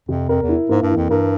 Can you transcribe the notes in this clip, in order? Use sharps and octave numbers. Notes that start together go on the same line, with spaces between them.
F2 C3
F2 A#4
E2
E4
G#2 A#3
G2
E3
F2
G2 A#4